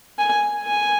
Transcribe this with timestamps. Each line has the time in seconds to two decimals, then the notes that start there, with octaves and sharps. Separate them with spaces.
0.19 G#5
0.63 G#5